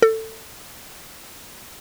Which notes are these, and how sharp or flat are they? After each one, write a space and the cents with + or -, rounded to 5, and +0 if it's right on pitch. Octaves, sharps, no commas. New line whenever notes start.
A4 +20